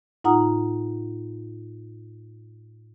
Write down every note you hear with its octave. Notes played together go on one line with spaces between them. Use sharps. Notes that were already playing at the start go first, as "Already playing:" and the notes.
A2 D#4 F4 F#5 A#5 D#6